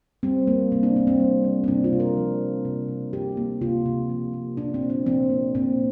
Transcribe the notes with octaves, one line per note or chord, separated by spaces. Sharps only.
G3 C4
A#3
C3 C4
D4
C3 C4
C4
G3
A#3
C4
C3 D4
F4
C3
A#4
F3
A#3
C3
C3
F3 G4
A#3
C3 F4
C3
F3
A#3
A#2 D4
C4
A#2
D4
F3 C4
A#3
A#2 C4